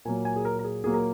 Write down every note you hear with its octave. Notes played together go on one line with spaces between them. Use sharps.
A#2 F#3 A#3 G#5
G#5
G#4
A#4
A#4
G#4
A#2 F#3 A#3 G#4
A#4